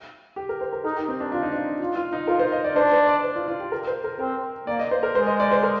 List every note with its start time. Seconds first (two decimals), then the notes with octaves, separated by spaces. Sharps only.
0.36 G4
0.49 A#4
0.61 C5
0.73 A#4
0.84 D#4 A#4
0.96 G4
1.08 C4
1.20 D4
1.32 D4 F4
1.42 D#4
1.52 D4
1.81 F4
1.96 F4
2.13 D#4
2.27 F4 A#4
2.39 C5
2.52 D#5
2.64 D5
2.76 D4 C5
2.92 C5
3.07 D5
3.24 C5
3.36 F4
3.48 F4
3.60 G4
3.72 A#4
3.87 C5
4.04 A#4
4.19 C4 A#4
4.67 A#3 D5
4.79 D#5
4.91 C5
5.03 A#4
5.15 G#3 C5
5.27 D#5
5.40 D5
5.51 C5
5.63 A#4